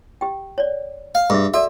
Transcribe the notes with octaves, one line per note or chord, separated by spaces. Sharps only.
G4 G5
C#5 D5
F5
G2 G#4 E5
F#4 A4 D5 E5